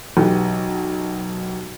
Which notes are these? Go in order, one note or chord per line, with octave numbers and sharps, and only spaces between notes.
B1 E3 G4